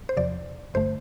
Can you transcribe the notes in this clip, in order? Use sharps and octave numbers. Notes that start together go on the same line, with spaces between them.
C5
E2 C3 F3 D5
G1 G2 D3 A3 C5